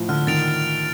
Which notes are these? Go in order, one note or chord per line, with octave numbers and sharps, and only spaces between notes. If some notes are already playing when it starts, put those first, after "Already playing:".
Already playing: A2 F3
D3 F6
D#3 A6 D7 F7